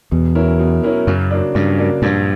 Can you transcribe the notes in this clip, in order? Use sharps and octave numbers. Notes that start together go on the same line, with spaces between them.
E2 B2
F#3 C#4 E4 A#4
B2
F#3 C#4 E4 A#4
F#2 C#3
F#3 A#3 D4
G2 C#3
F#3 A#3 D4
A#1 G2